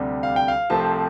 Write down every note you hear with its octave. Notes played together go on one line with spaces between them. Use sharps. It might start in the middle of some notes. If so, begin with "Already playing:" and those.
Already playing: D2 C3 G3 D4
F5
G5
F5
C2 C3 F3 A3 C4 A5